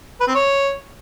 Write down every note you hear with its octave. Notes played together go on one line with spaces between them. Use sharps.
B4
C4
C#5